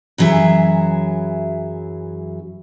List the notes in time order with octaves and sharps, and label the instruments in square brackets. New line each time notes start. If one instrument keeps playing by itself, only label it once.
[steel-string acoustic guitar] F#2 E3 F#3 G#4 E5